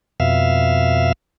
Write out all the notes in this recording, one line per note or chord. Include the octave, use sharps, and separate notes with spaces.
F2 B2 E5 F5